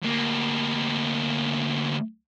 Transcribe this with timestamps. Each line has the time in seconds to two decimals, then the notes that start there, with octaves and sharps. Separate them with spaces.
0.02 D2 A#3